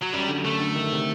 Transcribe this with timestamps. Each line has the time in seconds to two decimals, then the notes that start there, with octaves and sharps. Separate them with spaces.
0.02 F#3
0.13 F#2 G3
0.28 D3
0.45 F#2 A3
0.60 D3
0.76 D#3
0.92 C3